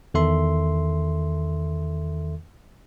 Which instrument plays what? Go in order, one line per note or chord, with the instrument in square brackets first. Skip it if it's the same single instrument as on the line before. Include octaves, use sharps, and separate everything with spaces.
[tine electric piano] E2 D#3 A4 E5 C6